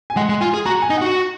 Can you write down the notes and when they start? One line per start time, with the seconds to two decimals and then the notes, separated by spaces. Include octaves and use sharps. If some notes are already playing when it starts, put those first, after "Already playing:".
0.10 G#5
0.17 G#3 F#5
0.29 G#3
0.41 F4 G#5
0.54 G#4
0.66 F#4 A#5
0.82 G#5
0.90 D#4
0.98 F#4 F#5